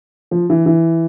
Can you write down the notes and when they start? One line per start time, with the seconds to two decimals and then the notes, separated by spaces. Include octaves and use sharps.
0.31 F3
0.50 E3
0.66 E3